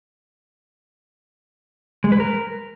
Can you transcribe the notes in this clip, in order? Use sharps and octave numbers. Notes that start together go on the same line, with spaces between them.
G#3
B4
A#4